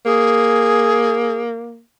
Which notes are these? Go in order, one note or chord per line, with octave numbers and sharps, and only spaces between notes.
A#3 G#4